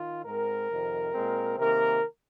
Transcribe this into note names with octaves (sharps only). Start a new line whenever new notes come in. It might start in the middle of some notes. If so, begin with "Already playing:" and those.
Already playing: D#3 F4
G#2 G#3 C4 A#4
F2 C3 D#3 C4
A#2 G#3 C4
C3 D#3 A#3 A#4